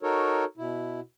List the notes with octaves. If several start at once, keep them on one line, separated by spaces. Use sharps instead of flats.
D#4 F#4 A4 A#4 C#5
B2 E4